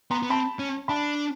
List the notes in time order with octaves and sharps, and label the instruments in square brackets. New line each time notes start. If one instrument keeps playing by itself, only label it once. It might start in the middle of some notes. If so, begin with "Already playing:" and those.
[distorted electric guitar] B3 [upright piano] A#5 C6
[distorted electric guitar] B3
[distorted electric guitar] C4 [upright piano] A5 B5
[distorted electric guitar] C#4
[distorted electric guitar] D4 [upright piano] A5 B5